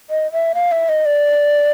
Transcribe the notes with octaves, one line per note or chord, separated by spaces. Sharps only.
D#5
E5
F5
E5
D#5
D5